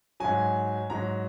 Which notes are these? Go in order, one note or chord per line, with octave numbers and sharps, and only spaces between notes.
G#2 F#3 G#5
G#2 F#3 A#5